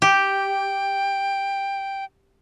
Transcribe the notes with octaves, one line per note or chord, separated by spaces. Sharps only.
G4 G5